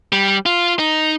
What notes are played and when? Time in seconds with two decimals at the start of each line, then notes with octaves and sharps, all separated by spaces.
0.12 G3
0.46 F4
0.79 D#4